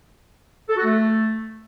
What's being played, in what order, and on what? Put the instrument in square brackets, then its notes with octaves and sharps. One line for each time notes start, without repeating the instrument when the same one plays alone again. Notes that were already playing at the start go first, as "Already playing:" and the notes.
[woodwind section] A4
F#4
A3